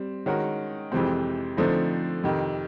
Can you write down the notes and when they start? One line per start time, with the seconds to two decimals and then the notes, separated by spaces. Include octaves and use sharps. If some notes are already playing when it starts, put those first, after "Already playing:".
Already playing: G3 C4
0.26 D#3 G#3 C#4 F#4 A#4
0.92 F2 C3 E3 G#3 C4
1.57 D3 F3 A3 C4 D#4
2.24 F2 C3 D#3